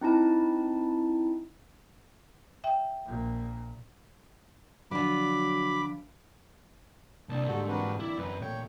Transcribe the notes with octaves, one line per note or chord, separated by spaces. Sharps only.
C4 D#4 E4 A5
E5 G5
A#1 A#2
D3 F3 F#3 B5 D6
C2 A#3 D4 A5
G#2 D3 G3 F4 F#4 A4
E3 C4 D4 F#4 A#4 B4
E4 D5
F#2 B4
A#2 A3 C#5 G5 C#6